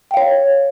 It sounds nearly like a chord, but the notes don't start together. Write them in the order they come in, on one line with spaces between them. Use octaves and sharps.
G5 F5 C#5